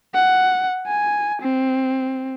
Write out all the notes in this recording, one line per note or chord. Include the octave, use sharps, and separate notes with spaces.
F#5
G#5
C4